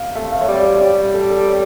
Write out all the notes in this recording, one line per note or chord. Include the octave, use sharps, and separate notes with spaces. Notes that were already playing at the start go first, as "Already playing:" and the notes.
Already playing: F5
A3 E5
F5
C#5
G3 D5
C#5
G3 D5
A4
A4
C#5